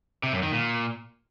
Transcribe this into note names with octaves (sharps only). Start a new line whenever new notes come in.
C3
F#2
D#3
A#2